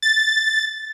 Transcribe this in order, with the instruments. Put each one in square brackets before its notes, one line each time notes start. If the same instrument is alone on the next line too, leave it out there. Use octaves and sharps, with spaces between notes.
[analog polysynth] A6